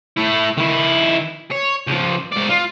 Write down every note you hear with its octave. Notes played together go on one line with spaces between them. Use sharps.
A3 E4
D#3 E4
C#5
C#2 F3
G#2 D5
F4